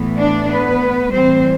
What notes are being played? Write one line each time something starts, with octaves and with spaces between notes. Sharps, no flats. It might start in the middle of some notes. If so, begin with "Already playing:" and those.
Already playing: A2 E3 B3
D4 D5
B3 B4
A2 E3 G3 C4 C5